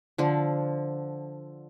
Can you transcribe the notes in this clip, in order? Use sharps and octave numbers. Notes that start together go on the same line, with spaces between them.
D3 F3